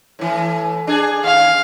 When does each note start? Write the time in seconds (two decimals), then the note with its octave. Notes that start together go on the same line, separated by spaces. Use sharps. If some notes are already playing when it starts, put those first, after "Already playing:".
0.19 A2 E3
0.87 D4 G#4
1.24 D#2 F5